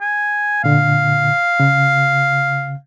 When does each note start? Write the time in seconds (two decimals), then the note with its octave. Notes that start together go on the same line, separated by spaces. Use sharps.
0.01 G#5
0.64 A#2 D3 F5
1.60 C#3